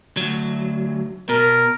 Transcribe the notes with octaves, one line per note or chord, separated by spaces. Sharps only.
D2 F#3
B2 A#4